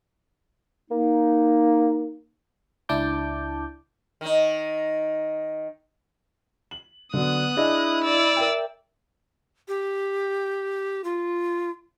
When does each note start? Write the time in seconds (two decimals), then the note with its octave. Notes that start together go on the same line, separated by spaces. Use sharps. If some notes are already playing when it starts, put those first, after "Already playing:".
0.91 A#3 D#4
2.89 C#2 D4 E4 A5 D6 G6
4.21 D#3 D#4
6.71 F#7
7.14 D3 F#3 B3 D#6 F#6
7.57 D4 E4 G#4 D#5
8.04 D5 E6
8.36 A#4 E5 G5
9.68 G4
11.04 F4